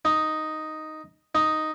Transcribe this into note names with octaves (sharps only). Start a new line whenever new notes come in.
D#4
D#4